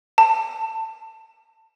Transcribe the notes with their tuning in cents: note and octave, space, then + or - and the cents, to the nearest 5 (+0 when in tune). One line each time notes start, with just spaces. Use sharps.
A5 +20